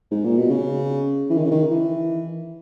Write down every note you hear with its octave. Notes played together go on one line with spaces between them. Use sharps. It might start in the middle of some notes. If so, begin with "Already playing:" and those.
G#2
A#2
B2
C#3
E3
D#3
C#3
D#3
E3